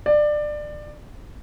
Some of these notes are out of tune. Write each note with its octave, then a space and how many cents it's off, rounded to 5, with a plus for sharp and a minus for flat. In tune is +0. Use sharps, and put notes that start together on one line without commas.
D5 +20